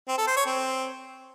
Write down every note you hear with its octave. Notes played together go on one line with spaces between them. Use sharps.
C4
A4
C5
C#5
C4